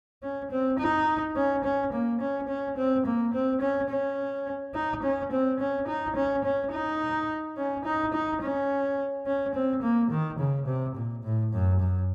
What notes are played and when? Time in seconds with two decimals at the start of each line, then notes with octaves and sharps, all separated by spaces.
0.23 C#4
0.51 C4
0.79 D#4
1.36 C#4
1.64 C#4
1.93 A#3
2.20 C#4
2.48 C#4
2.77 C4
3.05 A#3
3.33 C4
3.61 C#4
3.90 C#4
4.74 D#4
5.03 C#4
5.31 C4
5.59 C#4
5.87 D#4
6.16 C#4
6.44 C#4
6.72 D#4
7.57 C#4
7.84 D#4
8.13 D#4
8.41 C#4
9.26 C#4
9.54 C4
9.82 A#3
10.11 D#3
10.39 C#3
10.67 C3
10.96 A#2
11.23 A2
11.52 F#2
11.80 F#2